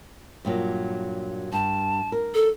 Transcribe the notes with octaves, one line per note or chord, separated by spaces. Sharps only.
G2 A#2 F#3
G2 A5
A#4
A4